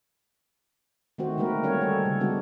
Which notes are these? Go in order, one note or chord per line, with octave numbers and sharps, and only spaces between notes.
D#3 A3 C4 F#4 C5
D3 G#3 A#3 C4 A#4 B4
G3 C4 C#4 C#5
A4
C#3
G#3 B3 D4 F#4